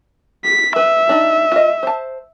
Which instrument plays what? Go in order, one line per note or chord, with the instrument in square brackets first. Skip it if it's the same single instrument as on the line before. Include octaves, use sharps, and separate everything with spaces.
[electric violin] B6
[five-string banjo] B4 [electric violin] E5
[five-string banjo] D4 D#4
F4 D#5
C5 A5